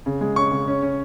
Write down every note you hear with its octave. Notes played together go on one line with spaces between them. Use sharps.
C#3
G#3
C#4 C#6
C#3
C#4
C#4